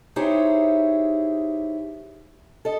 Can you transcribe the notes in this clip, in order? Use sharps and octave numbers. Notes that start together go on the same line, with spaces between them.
D#4 E4 G4 G#4 C5 C#5
A4 D#5